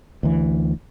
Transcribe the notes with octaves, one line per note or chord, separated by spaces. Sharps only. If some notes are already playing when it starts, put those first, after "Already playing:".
D2 E3